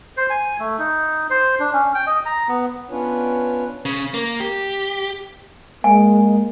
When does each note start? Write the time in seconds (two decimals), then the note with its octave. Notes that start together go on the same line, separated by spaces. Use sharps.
0.17 C5
0.30 G#5
0.60 A3
0.79 D#4
1.30 C5
1.60 D4
1.74 C#4
1.94 G5
2.07 D#5
2.26 A#5
2.48 B3
2.90 B3 C#4 D4 F4 B4 C#5
3.85 C#3
4.14 A#3
4.40 G4
5.84 G#3 A#3 G#5